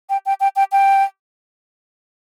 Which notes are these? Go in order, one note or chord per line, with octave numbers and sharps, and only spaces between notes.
G5
G5
G5
G5
G5